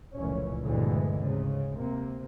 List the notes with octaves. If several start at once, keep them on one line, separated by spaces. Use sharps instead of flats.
F1 C#2 A#2 E3 C#4
D2 G2 A#2 E3 G#3 B3
G#2 C#3
C3 A#3